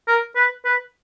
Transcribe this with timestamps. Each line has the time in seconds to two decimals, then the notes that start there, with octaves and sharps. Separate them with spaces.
0.07 A#4
0.36 B4
0.65 B4